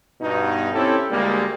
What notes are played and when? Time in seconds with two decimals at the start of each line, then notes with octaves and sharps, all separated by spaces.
0.21 G2 B2 B3 D#4
0.74 C4 C#4 E4 G4 A4
1.11 D2 G3 G#3 A#3